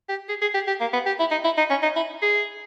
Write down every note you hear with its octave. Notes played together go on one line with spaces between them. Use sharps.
G4
G#4
G#4
G4
G4
A#3
B3
G4
E4
D#4
E4
D#4
C#4
D#4
E4
G#4